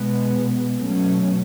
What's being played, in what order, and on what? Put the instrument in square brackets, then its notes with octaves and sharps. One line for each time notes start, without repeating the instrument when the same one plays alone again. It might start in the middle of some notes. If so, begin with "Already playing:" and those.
Already playing: [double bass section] B2 G#3 B3
B2 F#3 A3 C#4